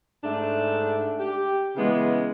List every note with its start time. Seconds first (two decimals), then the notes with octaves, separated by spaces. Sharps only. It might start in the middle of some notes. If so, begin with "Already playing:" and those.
0.23 G#2 A3 D4
1.19 G4
1.76 C#3 E3 G#3 B3